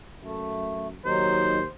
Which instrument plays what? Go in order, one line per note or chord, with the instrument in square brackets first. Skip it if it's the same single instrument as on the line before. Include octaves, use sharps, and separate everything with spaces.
[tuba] F#2 [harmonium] A3
[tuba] D#2 [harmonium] F#3 D#4 [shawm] C5